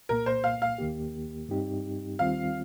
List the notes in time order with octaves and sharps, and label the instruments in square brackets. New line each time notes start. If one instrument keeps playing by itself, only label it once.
[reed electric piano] C2 A#2 A#3 [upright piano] A#4
[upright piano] C5
F5
F5
[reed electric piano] D#2 D#3 A#3 G4
G2 G3 C4 D#4 G4
[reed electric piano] D#2 D#3 G3 C4 F4 [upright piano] F5